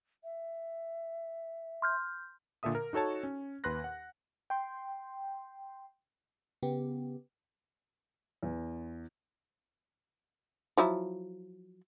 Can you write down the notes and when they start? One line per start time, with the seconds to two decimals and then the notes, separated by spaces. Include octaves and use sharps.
0.24 E5
1.82 C6 F6 G6
2.63 A#2 D3 A4 E5 D#6
2.75 A#4
2.93 D#4 F#4 A4 C#5 A5
3.23 C#4
3.64 D#2 B4 C6 F#6 A#6
3.84 F#5
4.50 G5 C6
6.63 C#3 B3 G4
8.43 E2
10.77 F3 F#3 E4